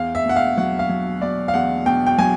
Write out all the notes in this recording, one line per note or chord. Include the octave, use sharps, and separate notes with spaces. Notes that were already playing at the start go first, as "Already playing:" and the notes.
Already playing: E2 F5
E5
B2 F#5
F5
F#3 F#5
F5
F#3
B2 D5
F5
E2 F#5
B2 G5
G5
F#3 G#5